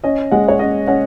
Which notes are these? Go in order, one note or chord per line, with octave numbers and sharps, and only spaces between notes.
C#4 D#5
G#3 F#5
C#5
C#4 D#5
C#4 F#5